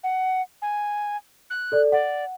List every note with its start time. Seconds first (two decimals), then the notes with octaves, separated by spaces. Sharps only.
0.03 F#5
0.62 G#5
1.50 F#6
1.72 A4 D5
1.92 D5 F#5